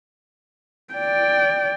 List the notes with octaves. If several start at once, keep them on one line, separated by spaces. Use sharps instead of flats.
D5 G5